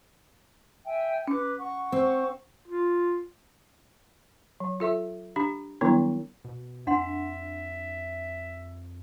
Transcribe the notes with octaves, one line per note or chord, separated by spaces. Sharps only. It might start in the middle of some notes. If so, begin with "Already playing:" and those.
E5 G5 G#5
C#4 B4 D6
F#5 C#6
C4
F4
F#3
F4 A4 E5
D4 G4 B5
D#3 F#3 G3 B3 D4 E4
B2
F2 D4 E5 F#5 C6